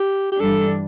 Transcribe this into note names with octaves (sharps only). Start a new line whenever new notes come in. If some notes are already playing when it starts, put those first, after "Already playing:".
Already playing: G4
G4
G2 E3 G3 D4 A4